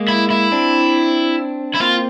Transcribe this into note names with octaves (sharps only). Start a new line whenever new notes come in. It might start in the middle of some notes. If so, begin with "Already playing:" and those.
Already playing: G#3 A#3
E4
E4
C4 D4
E4
A#3 C4 F4